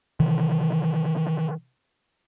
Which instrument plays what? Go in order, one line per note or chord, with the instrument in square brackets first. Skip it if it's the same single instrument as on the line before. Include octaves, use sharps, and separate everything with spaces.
[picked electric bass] C3 D#3 E3